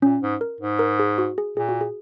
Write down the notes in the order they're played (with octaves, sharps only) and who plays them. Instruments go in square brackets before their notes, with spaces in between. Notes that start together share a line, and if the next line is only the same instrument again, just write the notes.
[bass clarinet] A#2 [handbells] C#4
[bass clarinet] G#2
[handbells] A#4
[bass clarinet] G#2
[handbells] A#4
G#4
F#4
G#4
[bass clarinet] A#2 [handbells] G#4
[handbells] F#4
G#4